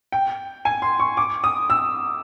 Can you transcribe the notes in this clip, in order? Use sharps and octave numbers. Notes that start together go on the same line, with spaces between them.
G5
G#5
C6
C#6
D6
D#6
E6